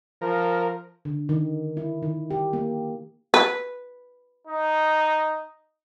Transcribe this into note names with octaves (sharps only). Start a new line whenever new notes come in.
F3 A#4
D3
D#3
E4
D#3
G4
A#3
B4
D#4